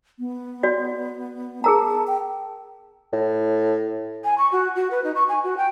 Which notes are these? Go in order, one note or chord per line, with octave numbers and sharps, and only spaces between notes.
B3
F#4 D5
G#4 A#4 A5 A#5
G5
A2
G#5
C#6
F#4
F#4
B4
D#4
C#6
G#5
F#4
G5